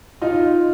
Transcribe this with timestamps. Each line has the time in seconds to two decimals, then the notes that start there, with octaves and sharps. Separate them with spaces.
0.22 D#4 F4